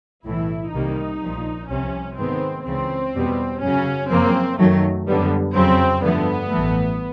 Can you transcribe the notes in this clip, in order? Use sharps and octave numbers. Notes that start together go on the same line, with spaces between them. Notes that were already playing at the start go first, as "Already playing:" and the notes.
B1 A2 E3 E4
C2 C3 D#3 G3 A#3 D#4
A#1 A#2 F3
C2 C3 F3 C#4
G#2 D#3 G#3 B3 C4
C#2 C#3 E3 C4
E2 B2 G3 B3
F#2 C#3 F#3 C#4
F#2 C#3 F3 A#3 C4
F#2 D#3 F#3 A3
F#2 D3 G3 B3
F2 C#3 F#3 C4
G2 D3 F3 A3 B3
A1 G2 E3 A3